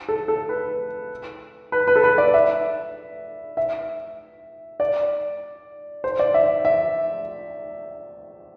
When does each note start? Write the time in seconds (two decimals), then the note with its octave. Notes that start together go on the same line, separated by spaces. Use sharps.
0.09 A4
0.28 A4
0.49 B4
1.72 B4
1.88 B4
1.96 A4
2.04 B4
2.18 D5
2.34 E5
3.57 E5
4.80 D5
6.04 C5
6.19 D5
6.34 E5
6.65 E5